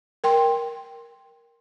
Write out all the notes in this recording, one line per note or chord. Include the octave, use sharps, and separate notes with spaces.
A#4 G5 C6